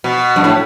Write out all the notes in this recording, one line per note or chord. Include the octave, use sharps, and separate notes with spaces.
B2
G2
A2